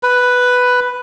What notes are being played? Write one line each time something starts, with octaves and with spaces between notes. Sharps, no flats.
B4